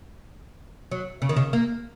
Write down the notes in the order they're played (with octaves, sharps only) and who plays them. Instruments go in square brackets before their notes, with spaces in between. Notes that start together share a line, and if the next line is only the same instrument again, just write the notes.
[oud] F#3
C#3
D#3
C#3
A#3